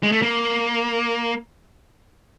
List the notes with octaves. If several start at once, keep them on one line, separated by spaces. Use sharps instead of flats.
G#3
A3
A#3